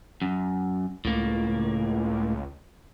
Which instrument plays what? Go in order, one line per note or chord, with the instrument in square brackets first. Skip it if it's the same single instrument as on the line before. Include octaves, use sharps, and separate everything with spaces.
[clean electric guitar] F#2
[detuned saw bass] C#2 [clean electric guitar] A2 A#3